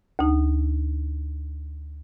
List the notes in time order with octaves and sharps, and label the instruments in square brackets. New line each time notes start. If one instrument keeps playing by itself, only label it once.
[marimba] D2 D#4